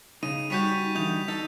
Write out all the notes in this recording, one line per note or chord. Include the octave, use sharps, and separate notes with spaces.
C#3 D#4 D#7
G3 C#4 F#4 G6 B6 F7
D3 E3 D#4 D#6 G6 F7
D#4 A4